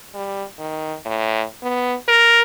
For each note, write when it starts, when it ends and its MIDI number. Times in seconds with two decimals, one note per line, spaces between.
0.15 0.44 55
0.59 0.95 51
1.06 1.44 45
1.63 1.95 59
2.08 2.41 70